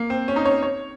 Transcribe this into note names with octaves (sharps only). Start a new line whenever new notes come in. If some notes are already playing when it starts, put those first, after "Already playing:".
Already playing: A#3
C4
C#4
D#4
C#5
C#5